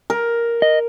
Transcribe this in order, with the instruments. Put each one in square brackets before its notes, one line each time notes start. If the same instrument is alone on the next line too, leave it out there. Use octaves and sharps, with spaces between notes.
[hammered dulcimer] A#4
[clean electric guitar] D#5